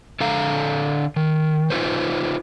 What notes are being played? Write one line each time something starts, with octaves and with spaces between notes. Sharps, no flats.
D3 A4 F5 A#5
D#3
D#4 F4 B4 C5